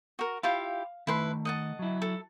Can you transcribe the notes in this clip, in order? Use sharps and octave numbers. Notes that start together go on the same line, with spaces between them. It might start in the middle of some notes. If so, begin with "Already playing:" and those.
F#4 A#4
E4 F4 G4 F5
D#3 A3 E4 B4 C6
D#5 F#5 A5
F#3 E4
A4